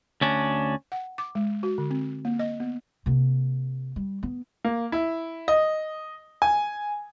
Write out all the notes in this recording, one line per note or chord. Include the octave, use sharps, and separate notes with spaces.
D2 C#4 D4
F#5
D6
G#3
F#4
D3
C4
A#3
D#5
B3
C3 A#3
G3
B3
A#3
E4
D#5
G#5